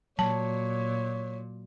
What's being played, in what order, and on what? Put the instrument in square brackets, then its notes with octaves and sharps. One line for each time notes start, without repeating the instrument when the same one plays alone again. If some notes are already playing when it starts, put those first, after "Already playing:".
[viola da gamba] A#2 [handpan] F#3 [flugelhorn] C#5 [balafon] A5